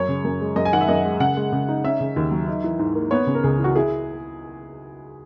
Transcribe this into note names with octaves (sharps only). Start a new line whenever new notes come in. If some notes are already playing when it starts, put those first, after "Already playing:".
Already playing: F#2 C#4 C#5
C#3
F#2
G#3
F#2 D#5
G#5
D#3 F#5
E5
F#2 D#5
G#3
C#3 F#5
G#3
C#3
D#4
C#4 E5
C#3
D#2
F#3
D#4
E3
G#2
A#3
B3 C#5
C#3
A#4
C#2 G#4
E3
F#4
E4 G#4